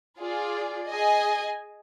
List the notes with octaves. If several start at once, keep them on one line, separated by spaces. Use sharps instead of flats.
F4 G#4 D5
G#4 D#5 G#5